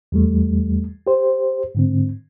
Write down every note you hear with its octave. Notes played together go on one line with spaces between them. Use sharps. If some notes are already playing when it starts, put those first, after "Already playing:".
E2 G3 A3
G4 C5
G#2 D3 C4